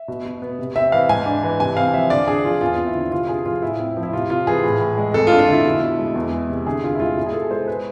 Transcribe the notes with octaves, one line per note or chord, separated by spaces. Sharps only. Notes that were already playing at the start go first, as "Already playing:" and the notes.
Already playing: E5
B2
B2
B3
C3
C4 E5
E3 F5
G#2 G#5
D4
E3
C3 G#5
C4 F5
F3 E5
D3 D5
D4 G#4
F3 F4
E2 F4
C4
E4
D3
C3 F4
D4 G#4
F3 F4
A2 E4
C4
F3
E4
C3 F4
C3 F4
E3 G#4
A2
A2
G#3
F2 A4
F4
D4
F4
D3 E4
B2
B2
G#3
E2
G#3
C3
D3 G#4
D4 F4
E4
G#3 F4
B2 E4
G#4
B2 A4
G#3 C5
B4